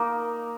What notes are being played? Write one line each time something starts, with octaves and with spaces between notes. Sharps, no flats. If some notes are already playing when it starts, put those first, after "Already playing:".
Already playing: A#3 D#4 A#4